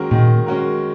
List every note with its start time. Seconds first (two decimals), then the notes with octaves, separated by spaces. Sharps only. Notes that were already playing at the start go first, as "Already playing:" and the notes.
Already playing: D#3 G#3 C#4 F#4 A#4
0.11 A#2 D#3
0.46 G#3 C#4 F#4 A#4